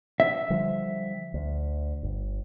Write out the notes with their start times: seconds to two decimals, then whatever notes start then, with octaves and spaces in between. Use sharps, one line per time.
0.20 E5
0.50 D3 F3 G3
1.34 D2
2.03 G1